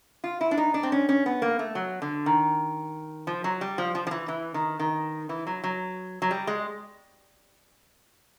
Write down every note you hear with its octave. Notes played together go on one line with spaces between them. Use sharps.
F4
E4
D4
D#4
D4
C4
C#4
C#4
B3
A#3
A3
F#3
D3
D#3
F3
F#3
G3
F3
F3
F3
E3
E3
D#3
D#3
E3
F#3
F#3
F#3
G3
G#3